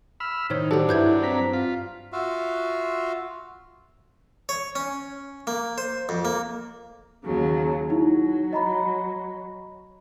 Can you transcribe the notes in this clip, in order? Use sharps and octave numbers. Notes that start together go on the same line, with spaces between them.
B5 E6 F6
A2 D#3 D#4 C5 C#5
D#3 F#3 D4 G4 A4 C5
G2 E4 B4 G6 G#6
C4 A#5 B6
F4 B6
F4 F#4 E5 F5
C#5
C#4
A#3
C5
F2
A#3
D#2 C#3 F#3
F#3 D#4 E4
D#5 A#5 B5